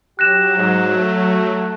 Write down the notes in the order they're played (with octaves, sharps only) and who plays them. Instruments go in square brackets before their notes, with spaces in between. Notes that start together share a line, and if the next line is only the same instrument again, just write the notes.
[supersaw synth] F#3 [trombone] G4 [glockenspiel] F#6 A#6 E7
[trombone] G#2
A3